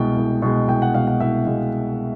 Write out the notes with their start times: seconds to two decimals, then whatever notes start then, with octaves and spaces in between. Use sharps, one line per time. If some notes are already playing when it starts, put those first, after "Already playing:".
Already playing: C2 B2 G#3 G5
0.17 C2
0.42 B2 G#3
0.68 C2 G5
0.82 F#5
0.94 B2 G#3 F5
1.07 F#5
1.20 C2 E5
1.47 B2 G#3